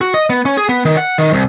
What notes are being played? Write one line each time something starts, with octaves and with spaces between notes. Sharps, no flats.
F#4
D#5
B3
C#4
G#4
B3
D#3
F#5
D#3
C2